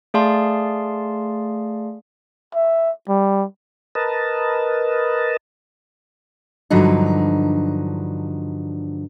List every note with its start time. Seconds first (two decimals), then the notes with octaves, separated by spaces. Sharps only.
0.14 A3 G#4 D5 F5 A5 C6
2.55 E5
3.09 G3
3.95 A#4 B4 D#5 A5
6.70 G2 D3 F3 F#3 D#4